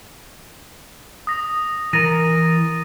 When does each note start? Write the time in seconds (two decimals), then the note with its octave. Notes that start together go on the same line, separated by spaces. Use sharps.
1.27 D#6 A#6
1.93 E3 A#4 A6 A#6 D#7